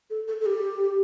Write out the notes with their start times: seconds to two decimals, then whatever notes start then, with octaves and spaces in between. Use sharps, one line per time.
0.10 A4
0.28 A4
0.41 A4
0.46 G4